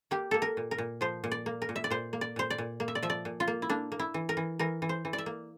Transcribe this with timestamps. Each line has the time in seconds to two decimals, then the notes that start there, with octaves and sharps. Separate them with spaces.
0.11 A#3 G4
0.31 A#3 A4
0.42 A#4
0.57 A#2
0.71 A#4
0.78 A#2
1.01 F3 C5
1.24 A#2
1.31 D5
1.46 A#3
1.62 A#4
1.69 A#2
1.76 E5
1.84 D5
1.90 A#2 C5
2.13 A#3
2.21 D5
2.36 A#2 C5
2.50 D5
2.58 A#2
2.80 A#3
2.88 E5
2.95 D5
3.03 F3 E5
3.10 D5
3.25 A#2
3.40 F4
3.48 A#3
3.62 E4
3.69 A#3 D4
3.92 A#3
3.99 E4
4.14 E3
4.29 A#4
4.37 E3
4.59 E3 A#4
4.82 E3
4.89 C5
5.05 E3
5.13 D5
5.18 E5
5.26 A#3